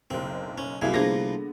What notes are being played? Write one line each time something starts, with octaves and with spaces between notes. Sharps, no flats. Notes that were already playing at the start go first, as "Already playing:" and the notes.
F#1 B1 C4
C#4
C2 F#2 A#3 E4 G#4 G#6
C2 D3 F3 A#3 B3 D4 G#4 A#6